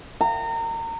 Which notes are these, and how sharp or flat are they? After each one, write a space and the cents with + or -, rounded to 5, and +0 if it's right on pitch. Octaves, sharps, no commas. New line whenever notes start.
A#5 -30